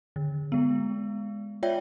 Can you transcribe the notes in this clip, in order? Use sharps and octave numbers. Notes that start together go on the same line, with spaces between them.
D3
G#3 B3
F4 C#5 D5 E5 G5